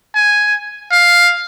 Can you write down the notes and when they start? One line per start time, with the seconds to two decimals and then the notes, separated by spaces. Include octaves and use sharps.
0.15 G#5
0.92 F5